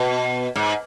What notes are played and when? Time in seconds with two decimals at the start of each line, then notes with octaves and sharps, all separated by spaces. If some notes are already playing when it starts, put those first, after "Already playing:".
Already playing: B2
0.56 G#2